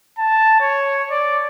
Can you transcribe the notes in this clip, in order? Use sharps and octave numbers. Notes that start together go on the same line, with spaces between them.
A5
C#5
D5